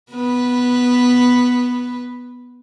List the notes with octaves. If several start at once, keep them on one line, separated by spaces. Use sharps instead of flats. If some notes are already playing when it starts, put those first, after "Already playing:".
B3 B4